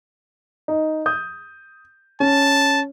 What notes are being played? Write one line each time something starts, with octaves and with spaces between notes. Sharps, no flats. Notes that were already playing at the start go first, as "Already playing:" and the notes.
D#4
D#6 G6
C#4 A5